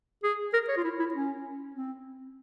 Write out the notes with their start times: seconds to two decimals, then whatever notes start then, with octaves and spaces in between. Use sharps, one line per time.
0.23 G#4
0.53 A#4
0.68 C#5
0.77 F4
0.84 E4
0.99 E4
1.14 C#4
1.74 C4